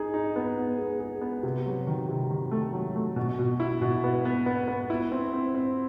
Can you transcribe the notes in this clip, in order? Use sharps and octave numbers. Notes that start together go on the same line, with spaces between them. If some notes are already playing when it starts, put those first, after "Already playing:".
Already playing: D#4 G#4
D#4
B3
B3
G#4
G#4
B3
C3
F#3
D#3
C3
D#3
A3
F#3
A3
B2
B2
E4
B2
B3
B3
B3
B3
E4
C4
C4
C4